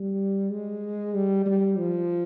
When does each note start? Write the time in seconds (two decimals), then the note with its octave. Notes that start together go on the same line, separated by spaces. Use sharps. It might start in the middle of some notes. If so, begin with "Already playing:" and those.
Already playing: G3
0.50 G#3
1.14 G3
1.46 G3
1.78 F3